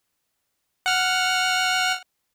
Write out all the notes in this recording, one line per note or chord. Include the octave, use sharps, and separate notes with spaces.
F#5 F6